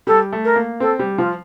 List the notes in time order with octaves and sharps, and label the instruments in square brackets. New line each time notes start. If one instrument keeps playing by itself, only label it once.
[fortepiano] G3 [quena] A4
[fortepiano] A3
[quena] A#4
[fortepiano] A#3
[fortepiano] C4 [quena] A4
[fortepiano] G3
[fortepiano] F3 [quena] F4